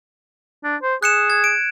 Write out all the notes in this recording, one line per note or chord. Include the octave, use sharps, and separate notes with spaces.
D4
C5
G#4 F#6 C#7 E7
G#6
D7